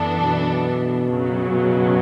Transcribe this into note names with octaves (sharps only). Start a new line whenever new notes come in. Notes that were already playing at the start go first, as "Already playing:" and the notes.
Already playing: F#2 E3 B3 D4 A4
B2
F#2 C#3 F#3
B2